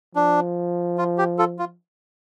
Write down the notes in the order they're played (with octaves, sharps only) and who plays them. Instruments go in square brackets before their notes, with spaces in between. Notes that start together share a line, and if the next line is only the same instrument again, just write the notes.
[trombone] F3 [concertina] D4
[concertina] F4
G4
F4 A4
F4